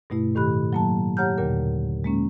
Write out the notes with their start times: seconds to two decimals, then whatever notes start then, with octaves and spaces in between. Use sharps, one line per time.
0.10 G2 B2 A3 E4
0.35 A2 D#3 G4 B5 F#6
0.73 F#3 A#3 A5
1.17 G4 C#5 F#5 A#5 F6 G6
1.38 D#2 A#2 D3 A#4
2.04 G#3 A#3 C#4